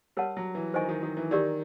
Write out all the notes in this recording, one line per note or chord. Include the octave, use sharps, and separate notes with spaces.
G3 A#4 C#5 F#5 A5
F#3
E3
D#3 C5 D#5 G#5 C#6
D#3
D#3
E3
D#3 G4 A#4 D5